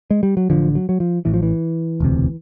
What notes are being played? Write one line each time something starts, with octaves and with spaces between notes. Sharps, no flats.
G#3
G3
F#3
A1 G2 D3 F3
F#3
F#3
F3
A1 A2 E3
F3
E3
E1 D2 C3